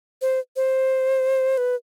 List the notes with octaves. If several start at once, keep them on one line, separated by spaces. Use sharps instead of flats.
C5
C5
B4